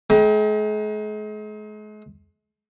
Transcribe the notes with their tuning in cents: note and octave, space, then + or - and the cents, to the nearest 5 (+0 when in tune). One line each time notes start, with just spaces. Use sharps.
G#3 +40 G5 +0 A#5 +35